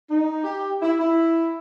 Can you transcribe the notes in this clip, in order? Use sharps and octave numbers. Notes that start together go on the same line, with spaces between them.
D#4
G4
E4
E4